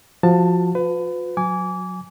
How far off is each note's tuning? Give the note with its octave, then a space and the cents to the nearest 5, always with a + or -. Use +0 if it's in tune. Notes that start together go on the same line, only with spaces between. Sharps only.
F3 +0 F#4 +0 A5 +15
F4 +45 B4 +30
F#3 -20 G#5 +0 D6 -30